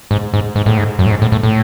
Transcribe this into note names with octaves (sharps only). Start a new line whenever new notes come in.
G#2
G#2
G#2
A2
G#2
F#2
A2
G#2
A2
A2
A2